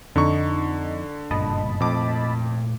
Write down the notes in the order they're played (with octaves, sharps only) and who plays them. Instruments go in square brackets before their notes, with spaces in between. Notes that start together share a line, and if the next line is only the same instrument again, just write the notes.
[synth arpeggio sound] F2 D#4 [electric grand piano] D3 C#6
[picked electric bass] F#1 G2 A#2 [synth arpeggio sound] D#5 A5 B5
[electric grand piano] F2 D6 [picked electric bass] A#2 A3